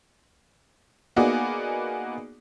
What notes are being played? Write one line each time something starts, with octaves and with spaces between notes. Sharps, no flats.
A#3 B3 D#4 F#4 G#4 D5